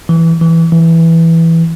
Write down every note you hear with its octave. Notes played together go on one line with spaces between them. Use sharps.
E3
E3
E3